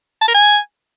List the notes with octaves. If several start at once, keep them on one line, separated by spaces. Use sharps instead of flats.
A5
A#4
G#5